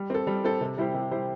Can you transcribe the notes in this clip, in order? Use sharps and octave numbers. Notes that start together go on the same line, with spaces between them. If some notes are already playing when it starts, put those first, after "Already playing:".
Already playing: G3
C4 A4
G3
C4 A4
C3
G3 E4 G4 C5
C3
G3 E4 G4 C5